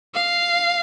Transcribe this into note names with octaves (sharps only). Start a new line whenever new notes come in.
F5